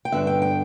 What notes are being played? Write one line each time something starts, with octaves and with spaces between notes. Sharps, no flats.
G5
G2 D3 B3 E5
G5
G5